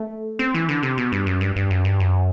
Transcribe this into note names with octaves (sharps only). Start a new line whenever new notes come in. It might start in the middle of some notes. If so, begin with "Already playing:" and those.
Already playing: A3
C4
E3
D3
C3
B2
G2
F#2
G2
G2
F#2
G2
F#2